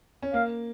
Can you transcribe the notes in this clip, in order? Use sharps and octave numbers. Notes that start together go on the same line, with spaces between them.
C#4
A#3 F5